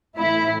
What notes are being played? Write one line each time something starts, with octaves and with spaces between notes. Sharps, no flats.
A2 E3 E4